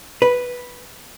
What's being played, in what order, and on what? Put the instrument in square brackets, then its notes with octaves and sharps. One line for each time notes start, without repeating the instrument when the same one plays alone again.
[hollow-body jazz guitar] B4